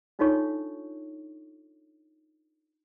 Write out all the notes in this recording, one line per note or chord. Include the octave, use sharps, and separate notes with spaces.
D4 D#4 F4 A4 C#5 C#6